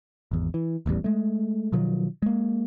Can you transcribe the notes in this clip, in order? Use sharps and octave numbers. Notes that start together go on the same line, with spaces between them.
G#1 E2
E3
D#1 A1 E2 G3
G#3 A3
B2 D#3 F3 F#3
G#3 A#3